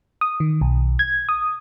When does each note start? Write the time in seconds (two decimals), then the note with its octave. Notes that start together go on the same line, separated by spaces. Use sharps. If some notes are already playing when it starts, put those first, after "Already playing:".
0.21 D#6
0.40 D#3
0.61 B1
0.99 G#6
1.29 D#6